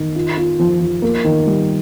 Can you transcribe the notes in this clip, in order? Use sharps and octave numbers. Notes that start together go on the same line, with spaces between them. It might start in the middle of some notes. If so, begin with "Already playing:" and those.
Already playing: D#3
F4
F4
F3
F3
A#3
D#3
G3